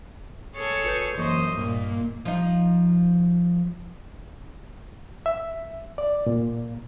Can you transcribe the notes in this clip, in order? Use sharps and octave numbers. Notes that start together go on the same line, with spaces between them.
G#4 A4 C#5
G1 B4 G6
F#2 E3 A#3 C5 D#5 C#6
G2 A#2 A#3
F3 D#4
E5
D5
A#2